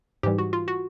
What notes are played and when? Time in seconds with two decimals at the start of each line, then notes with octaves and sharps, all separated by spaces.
0.23 G#2 E3 G3 G4
0.39 F#4
0.53 F4
0.68 F#4